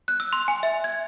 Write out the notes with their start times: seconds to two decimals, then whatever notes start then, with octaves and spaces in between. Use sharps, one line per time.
0.08 F#6
0.20 E6
0.33 C6
0.48 G#5
0.63 E5
0.84 G#6